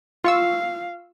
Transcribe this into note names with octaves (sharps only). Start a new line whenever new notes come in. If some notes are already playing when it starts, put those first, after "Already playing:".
F4 F5 C#6 E6